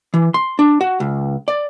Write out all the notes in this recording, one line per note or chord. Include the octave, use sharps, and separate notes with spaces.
E3
C6
D4
F#4
C#2
D5